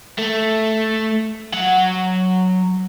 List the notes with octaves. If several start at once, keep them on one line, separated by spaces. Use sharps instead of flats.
A3
F#3 F#5